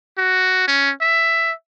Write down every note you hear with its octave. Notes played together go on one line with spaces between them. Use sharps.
F#4
C#4
E5